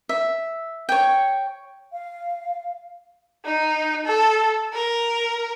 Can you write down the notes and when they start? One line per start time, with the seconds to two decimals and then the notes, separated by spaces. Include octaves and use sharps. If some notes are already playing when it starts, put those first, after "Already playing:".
0.09 E5
0.89 C#5 G5
1.93 F5
3.45 D#4
4.06 A4
4.73 A#4